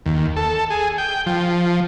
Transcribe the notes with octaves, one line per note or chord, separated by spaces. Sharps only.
D#2
A4
G#4
G5
F3